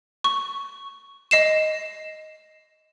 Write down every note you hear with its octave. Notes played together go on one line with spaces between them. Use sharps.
C#6
D#5 C7 E7